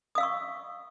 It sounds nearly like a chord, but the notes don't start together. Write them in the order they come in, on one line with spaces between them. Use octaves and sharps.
D#6 F5 E6 C#6